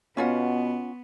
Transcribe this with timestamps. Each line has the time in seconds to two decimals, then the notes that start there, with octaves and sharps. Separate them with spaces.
0.17 B2 B3 C#4 F4 F#5